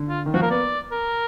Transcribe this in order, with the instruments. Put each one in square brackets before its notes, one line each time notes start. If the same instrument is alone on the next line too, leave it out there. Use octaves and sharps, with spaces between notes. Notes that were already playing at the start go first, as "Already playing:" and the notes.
Already playing: [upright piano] D3
[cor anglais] F4
[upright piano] D#3
[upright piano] F3 [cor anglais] F#4
[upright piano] A#3 [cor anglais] A#4
[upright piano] B3 [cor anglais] D5
[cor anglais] A#4